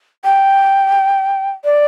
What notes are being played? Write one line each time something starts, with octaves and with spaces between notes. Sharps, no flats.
G5
D5